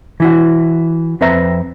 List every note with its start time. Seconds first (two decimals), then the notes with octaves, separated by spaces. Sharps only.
0.20 E3 E4 F#4
1.21 F2 C4 B4 E5 A#5